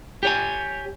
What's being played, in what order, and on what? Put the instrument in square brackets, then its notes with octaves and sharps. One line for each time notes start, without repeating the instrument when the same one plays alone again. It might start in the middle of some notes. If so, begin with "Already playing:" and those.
[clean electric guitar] G4 C#5 G#5